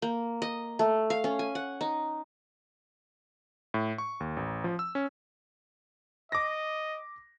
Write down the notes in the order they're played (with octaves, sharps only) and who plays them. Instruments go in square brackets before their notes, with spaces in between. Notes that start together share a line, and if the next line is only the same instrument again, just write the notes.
[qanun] A#3
D#5
A3
F5
C#4
G#5
F#5
D#4
[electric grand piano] A2
C#6
D#2
A1
F3
E6
C#4
[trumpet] D#5 [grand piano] D6 A#6